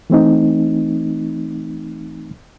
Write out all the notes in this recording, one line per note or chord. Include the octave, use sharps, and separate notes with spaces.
E3 A3 C4 D#4